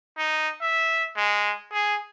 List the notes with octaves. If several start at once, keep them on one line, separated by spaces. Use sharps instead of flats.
D#4
E5
G#3
G#4